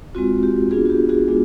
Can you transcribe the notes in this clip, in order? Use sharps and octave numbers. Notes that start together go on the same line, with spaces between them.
G#3 C4 F4 F#4
G4
B3 D4 F4 F#4 G#4
F#4
G4
F#4 G#4
G#3 B3 D4 F4